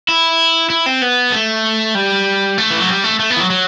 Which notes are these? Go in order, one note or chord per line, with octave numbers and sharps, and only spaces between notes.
E4
E4
C4
B3
A3
G3
A3
E3
F#3
G3
A3
A3
B3
E3
F#3
F#3